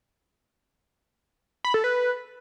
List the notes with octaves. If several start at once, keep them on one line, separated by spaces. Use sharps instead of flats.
B5
A4
B4